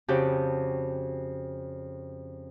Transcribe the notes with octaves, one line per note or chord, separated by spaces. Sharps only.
F2 C#3 F#4 G4 G5 A5